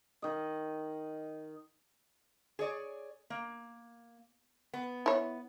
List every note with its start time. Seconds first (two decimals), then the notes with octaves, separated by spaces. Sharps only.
0.22 D#3 D#5
2.59 G#4 C#5 D5
3.30 A#3
4.73 B3
5.06 E4 C#5